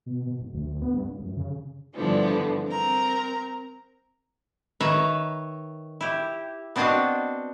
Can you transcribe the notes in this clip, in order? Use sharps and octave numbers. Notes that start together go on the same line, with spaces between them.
B2
B2
F#1
D2
D2
B3
G2
C#2
F#2
C#3
G2 D3 E3 F3 B3 D4
C4 A#4 A#5
D#3 B4 C#5 E5 A#5
E4 G4
B3 C4 D4 F#4 D#5 F5